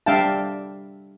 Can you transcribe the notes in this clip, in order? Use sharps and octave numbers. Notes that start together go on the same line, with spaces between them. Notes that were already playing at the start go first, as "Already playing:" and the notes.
G3 D4 E5 F5 G5 A5